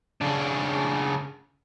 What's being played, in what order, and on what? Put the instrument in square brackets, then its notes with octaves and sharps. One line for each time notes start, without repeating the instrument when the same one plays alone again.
[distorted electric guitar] C#3 D4